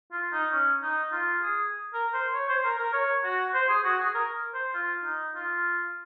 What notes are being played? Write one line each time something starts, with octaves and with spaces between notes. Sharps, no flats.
F4
D#4
C#4
D#4
F4
G#4
A#4
C5
C#5
C5
A#4
A#4
C#5
F#4
C5
G#4
F#4
G#4
A#4
C5
F4
D#4
F4